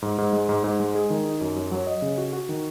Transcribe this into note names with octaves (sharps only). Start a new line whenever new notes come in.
G#2
G#2
G#3
G#2
G#2
G#3
G#4
D#3
D#4
F#2
F#2
F#3
D#5
C#3
F#4
F#4
D#3